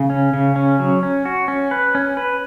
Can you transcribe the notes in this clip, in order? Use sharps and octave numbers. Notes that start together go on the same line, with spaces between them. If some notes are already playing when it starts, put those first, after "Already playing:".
Already playing: C#3
C#4
C#3
C#4
F#3
C#4
F#4
C#4
B4
C#4
B4